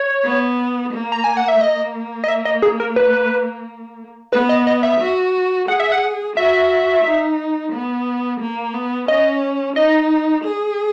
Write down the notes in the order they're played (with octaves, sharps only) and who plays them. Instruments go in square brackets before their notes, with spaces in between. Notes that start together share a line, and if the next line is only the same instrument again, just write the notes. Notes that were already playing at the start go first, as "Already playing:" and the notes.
Already playing: [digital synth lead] C#5
[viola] B3
A#3
[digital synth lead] A#5
G#5
F#5
E5
[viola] A#3 [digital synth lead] D#5
[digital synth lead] D#5
E5
D#5
G#4
A#4
B4
[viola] B3 [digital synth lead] B4
[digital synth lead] D#5
D#5
E5
[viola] F#4
[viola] G#4 [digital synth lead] F#5
[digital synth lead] E5
F#5
[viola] F#4 [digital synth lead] E5
[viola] D#4
B3
A#3
B3
[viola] C#4 [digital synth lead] D#5
[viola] D#4 [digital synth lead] D#5
[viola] G#4